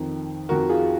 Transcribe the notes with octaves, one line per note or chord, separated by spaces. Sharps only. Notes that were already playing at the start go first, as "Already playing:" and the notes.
Already playing: F2 D#3
F2 D#3 F#4 A#4
F4 G#4